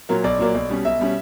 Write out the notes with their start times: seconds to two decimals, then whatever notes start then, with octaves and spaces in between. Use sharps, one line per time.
0.09 A#2 F#3 A#3
0.24 B1 D5
0.39 A#2 F#3 A#3
0.54 B1
0.70 B2 G3 C#4
0.85 B1 E5
1.00 B2 G3 C#4